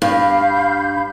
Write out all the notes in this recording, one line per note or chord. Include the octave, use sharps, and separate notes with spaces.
G2 F5 B5 G6